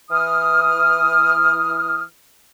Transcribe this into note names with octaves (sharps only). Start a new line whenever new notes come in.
E3 D#6 F6